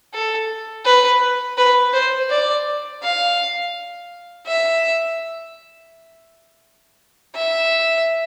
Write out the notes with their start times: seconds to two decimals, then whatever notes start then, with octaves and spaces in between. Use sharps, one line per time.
0.14 A4
0.85 B4
1.58 B4
1.93 C5
2.30 D5
3.03 F5
4.47 E5
7.35 E5